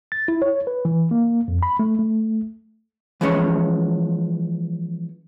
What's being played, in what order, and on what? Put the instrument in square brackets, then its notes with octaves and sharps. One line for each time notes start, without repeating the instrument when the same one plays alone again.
[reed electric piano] A6
E4
C#5
B4
E3
A#3
F2
B5
A3
A3
[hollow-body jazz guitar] E3 F3 G#3 B3 C#4 C#5